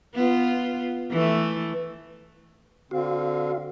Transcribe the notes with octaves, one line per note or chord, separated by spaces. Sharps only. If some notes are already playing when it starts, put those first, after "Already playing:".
B3 F4
E3 A3
D3 C4 F#4 F5